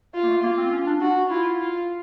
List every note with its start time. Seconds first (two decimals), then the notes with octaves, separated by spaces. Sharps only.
0.14 F4
0.23 A#3
0.28 A3
0.43 A#3 F4
0.57 C4
0.73 C#4
0.87 D4
1.01 D4 F#4
1.30 E4 F4
1.58 F4